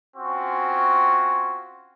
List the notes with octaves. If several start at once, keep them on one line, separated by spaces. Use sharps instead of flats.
C4 C#4 F4 F#4